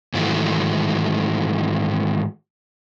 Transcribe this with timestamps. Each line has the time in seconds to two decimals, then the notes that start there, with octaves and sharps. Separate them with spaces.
0.14 G#2 D#3 E3 F#3 A3